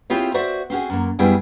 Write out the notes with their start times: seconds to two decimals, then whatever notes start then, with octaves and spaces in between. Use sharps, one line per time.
0.10 C4 E4 F4 G4 G#4 C#5
0.34 F#4 C5 D5 E5
0.70 C4 C#4 F#4 G#4
0.90 F#2 A#3
1.19 F#2 G3 B3 E4 G#4 G5